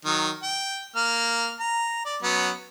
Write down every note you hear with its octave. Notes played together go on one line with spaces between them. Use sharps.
D#3 F#3
G5
A#3 F6
A#5
D5
F#3 B3 C#4